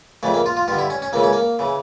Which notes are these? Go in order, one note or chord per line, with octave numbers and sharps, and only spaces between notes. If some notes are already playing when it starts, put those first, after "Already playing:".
F2 C#3 E3 A3
A#3
F4
F4
G2 D3 F4
E4
C#4
C#4
C#2 C#3 E3 A#3
C#4
A#3
C#3 E3